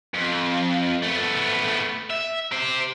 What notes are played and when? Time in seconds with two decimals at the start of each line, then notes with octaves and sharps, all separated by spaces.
0.14 F2
1.02 A3 B3
2.10 E5
2.52 G4 C5